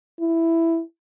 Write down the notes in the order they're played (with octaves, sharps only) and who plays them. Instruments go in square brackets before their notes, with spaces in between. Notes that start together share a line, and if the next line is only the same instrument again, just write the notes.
[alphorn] E4